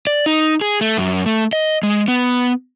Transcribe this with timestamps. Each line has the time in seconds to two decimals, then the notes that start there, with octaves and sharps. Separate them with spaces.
0.07 D5
0.26 D#4
0.61 G#4
0.81 A3
0.98 F#2
1.26 A3
1.53 D#5
1.83 G#3
2.08 B3